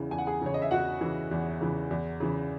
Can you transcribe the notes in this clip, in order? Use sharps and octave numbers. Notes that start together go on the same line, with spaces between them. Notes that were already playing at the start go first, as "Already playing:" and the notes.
Already playing: E2 C#3 E3 E4
E2 G#5
F#5
G#4 G#5
C#3 E3 C#5
D#5
E5
E2 F#4 F#5
C#3 E3
E2
C#3 E3
E2
C#3 E3